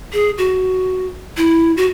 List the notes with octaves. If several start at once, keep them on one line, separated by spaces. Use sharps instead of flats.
G#4
F#4
E4
F#4